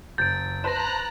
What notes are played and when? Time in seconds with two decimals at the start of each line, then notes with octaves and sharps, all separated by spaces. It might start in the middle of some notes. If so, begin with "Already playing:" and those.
0.18 F#1 G6 A6 D7
0.64 B4 C5 A5 A#5 F#6 A#6 E7